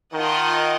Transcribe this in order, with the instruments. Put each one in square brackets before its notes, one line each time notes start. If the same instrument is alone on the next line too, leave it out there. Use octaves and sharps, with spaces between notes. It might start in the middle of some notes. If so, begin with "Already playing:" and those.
[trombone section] D#3 [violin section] F4 A#4 D#5 F#5 A5